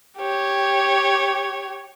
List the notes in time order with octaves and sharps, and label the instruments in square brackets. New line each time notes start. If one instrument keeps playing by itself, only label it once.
[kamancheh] G4 C#5